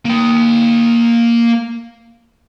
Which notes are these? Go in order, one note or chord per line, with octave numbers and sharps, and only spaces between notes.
A#3 G5